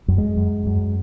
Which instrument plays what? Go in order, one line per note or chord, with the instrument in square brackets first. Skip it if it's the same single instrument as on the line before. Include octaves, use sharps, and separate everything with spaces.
[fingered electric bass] F#2
G#3
F#2
F#2